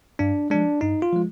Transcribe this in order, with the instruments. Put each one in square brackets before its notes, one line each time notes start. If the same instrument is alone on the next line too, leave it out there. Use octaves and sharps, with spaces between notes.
[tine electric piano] G2 D4
F3 G#3 D4
G2 D#4
F4
F3 G#3